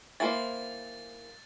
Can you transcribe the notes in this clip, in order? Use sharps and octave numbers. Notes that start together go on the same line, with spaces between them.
E3 A#3 C5 A6